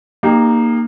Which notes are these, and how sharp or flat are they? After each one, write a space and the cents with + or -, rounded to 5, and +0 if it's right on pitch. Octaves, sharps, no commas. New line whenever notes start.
A#3 +0 D#4 -25 G4 +20